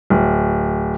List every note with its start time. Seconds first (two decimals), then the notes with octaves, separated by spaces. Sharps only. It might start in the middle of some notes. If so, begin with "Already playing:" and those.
0.10 D1